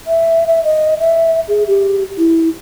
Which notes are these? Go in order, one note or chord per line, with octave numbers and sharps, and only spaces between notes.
E5
E5
D#5
E5
G#4
G4
E4